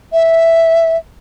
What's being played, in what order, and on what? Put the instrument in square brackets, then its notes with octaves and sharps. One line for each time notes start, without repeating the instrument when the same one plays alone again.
[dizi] E5